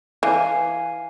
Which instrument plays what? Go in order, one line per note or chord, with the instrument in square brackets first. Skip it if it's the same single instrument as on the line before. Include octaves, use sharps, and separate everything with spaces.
[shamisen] E3 [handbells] F5 G#5